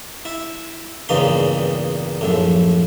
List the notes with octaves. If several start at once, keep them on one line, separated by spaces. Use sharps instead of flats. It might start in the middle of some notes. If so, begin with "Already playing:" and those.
E4
E2 G2 A#2 C#3 D#4 C6
A#1 F#2 A2